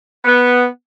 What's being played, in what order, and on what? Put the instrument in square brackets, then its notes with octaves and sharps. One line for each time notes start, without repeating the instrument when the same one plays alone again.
[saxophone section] B3